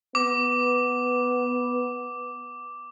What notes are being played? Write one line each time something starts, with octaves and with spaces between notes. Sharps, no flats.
B3 D6